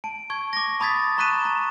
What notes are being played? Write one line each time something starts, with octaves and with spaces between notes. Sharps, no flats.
A5 D7
C#6 G#6
D6 A#6
A5 B5 D#6 G#6 A6 B6
A#5 C#6 F#6 B6 D#7 E7
A#5